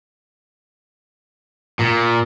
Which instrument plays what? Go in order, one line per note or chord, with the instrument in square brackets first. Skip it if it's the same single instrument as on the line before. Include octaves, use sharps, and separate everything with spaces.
[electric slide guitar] A#2